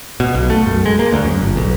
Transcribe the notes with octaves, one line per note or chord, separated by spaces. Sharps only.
B2
B1
A3
F#2
G#3
A#3
D2
F#2
G1
B1